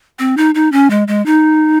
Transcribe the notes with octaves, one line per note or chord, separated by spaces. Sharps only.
C4
D#4
D#4
C#4
G#3
G#3
D#4